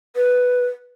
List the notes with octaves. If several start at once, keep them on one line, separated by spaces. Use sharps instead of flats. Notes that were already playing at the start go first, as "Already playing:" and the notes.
B4